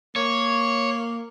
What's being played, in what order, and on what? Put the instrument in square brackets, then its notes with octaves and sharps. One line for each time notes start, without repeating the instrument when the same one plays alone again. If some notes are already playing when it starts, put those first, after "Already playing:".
[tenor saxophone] A#3 [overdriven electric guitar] C#5